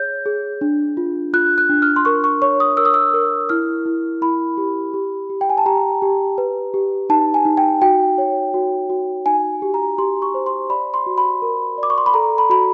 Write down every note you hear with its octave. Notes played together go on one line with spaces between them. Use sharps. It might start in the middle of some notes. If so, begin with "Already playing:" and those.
Already playing: G#4 C#5 G6
G#4
D4
F4
F4 F#6
F#6
D4
F6
C6
A#4 C#6
C#6
C#5 C#6
D#6
A#4 E6
D#6
E6
A#4
E4 F6
E4
E4 B5
G4
G4
G4
G5
G#5
A5
G4 A#5
G4
B4
G4
D#4 A5
G#5
D#4
G5
F#4 G5
C#5
F#4
F#4
D#4 G#5
G4
A#5
G4 C6
C#6
C5
C6
D5 B5
C6
F#4
B5
A#4
D5 D6
C#6
C6
B5
A4 A#5
B5
F#4 B5